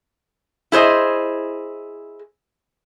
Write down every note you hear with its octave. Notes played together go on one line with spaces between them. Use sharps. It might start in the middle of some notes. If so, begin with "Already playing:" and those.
E4 G#4 C5 D#5